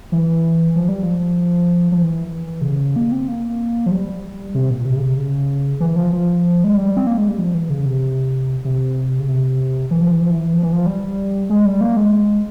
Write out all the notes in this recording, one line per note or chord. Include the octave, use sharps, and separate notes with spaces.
E3
F3
G3
F3
F3
E3
C3
C#3
A#3
C4
A#3
F3
G3
C3
A#2
C3
C#3
C3
C#3
E3
F3
F3
G#3
G3
C4
A#3
G#3
G3
F3
E3
C#3
C3
C3
C#3
C3
E3
F3
E3
F3
E3
F3
E3
F3
G3
G#3
G3
A#3
G#3